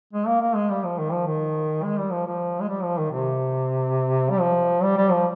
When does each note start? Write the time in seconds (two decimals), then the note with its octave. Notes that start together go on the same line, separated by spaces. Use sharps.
0.13 G#3
0.27 A#3
0.41 A#3
0.55 G#3
0.70 G3
0.84 F3
0.99 D#3
1.12 F3
1.27 D#3
1.83 G#3
1.97 G3
2.12 F3
2.26 F3
2.61 G#3
2.69 G3
2.83 F3
2.98 D#3
3.12 C3
4.30 G3
4.40 F3
4.83 G3
4.97 G3
5.12 F3